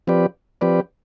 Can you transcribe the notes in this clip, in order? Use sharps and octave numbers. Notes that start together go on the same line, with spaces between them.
F3 C4 G4 B4 D5
F3 C4 G4 B4 D5